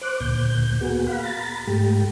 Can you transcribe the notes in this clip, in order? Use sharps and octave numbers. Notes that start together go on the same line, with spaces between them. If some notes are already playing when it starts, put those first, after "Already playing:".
C5 D6 F#6
D2 A#2 G6
A#3 B3 F#4 G#4
F5 F#5 B5
A#5 B5 A6
G#2 A3 G4